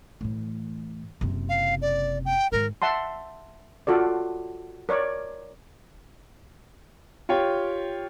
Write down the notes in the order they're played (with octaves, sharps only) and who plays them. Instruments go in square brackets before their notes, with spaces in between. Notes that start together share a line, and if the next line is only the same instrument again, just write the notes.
[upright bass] A2 E3
F#1 C3
[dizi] F5
D5
G5
[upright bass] G#2 D#3 [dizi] A#4
[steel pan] E5 F#5 A5 C6
F4 F#4 A4 D5
A#4 C#5 D5
[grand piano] F4 G4 C#5 G5